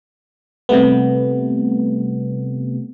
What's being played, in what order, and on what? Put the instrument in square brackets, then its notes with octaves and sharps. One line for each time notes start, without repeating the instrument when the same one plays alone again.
[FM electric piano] C3 G3 A3 B3